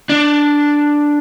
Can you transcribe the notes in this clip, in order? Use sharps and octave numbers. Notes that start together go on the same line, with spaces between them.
D4